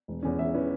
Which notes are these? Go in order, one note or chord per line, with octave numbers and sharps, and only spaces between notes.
E1
E2 E3 C#4
E1 E5
E3 C#4 B4